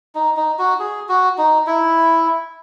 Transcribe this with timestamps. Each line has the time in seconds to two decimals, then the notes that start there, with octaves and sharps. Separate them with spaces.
0.15 D#4
0.37 D#4
0.59 F#4
0.80 G#4
1.09 F#4
1.38 D#4
1.67 E4